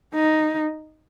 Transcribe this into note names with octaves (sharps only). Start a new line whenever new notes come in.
D#4